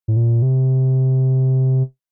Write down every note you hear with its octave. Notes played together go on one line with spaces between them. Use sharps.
A2
A#2
C3